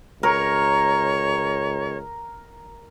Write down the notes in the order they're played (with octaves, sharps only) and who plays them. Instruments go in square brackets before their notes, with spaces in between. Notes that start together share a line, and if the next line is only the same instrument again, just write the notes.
[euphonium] C#2 [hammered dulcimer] A#4 [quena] C#5